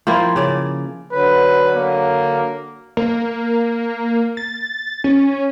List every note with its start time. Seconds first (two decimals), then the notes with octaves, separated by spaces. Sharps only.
0.07 F3 A#3 C4 E4
0.36 C#3 D5
1.12 D3 F#3 B4
1.75 A#3
2.97 A#3
4.37 A6
5.04 C#4